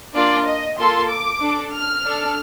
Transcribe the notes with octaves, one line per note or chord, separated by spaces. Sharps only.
A#3 D4 F4 D5
D#5
A#3 F4 A4 C6
D6
D4 A4
F6
D4 A4